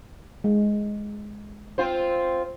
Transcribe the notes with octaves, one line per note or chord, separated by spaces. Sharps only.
G#3
C4 F4 C5